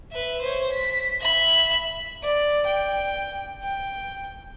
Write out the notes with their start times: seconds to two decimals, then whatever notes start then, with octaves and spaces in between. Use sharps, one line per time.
0.12 B4 E5
0.41 C5 C#5
0.72 B6
1.21 E5 B5
2.23 D5
2.66 G5
3.63 G5